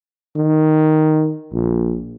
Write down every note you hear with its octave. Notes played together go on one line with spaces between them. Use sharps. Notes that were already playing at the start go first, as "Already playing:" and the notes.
D#3
A#1